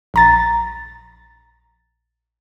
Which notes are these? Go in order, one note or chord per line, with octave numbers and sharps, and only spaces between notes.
A#1 A#5 A6